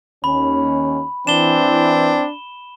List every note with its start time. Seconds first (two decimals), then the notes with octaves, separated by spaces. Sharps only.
0.24 D#2 C#4 B5
1.27 E3 C4 D4 E7 G7